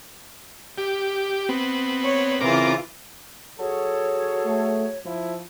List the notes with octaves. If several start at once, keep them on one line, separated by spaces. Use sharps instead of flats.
G4
B3 C4
C#5
C#3 E3 C4 F4 A#4 D6
F#3 G#4 A4 C#5
A3
F3 E4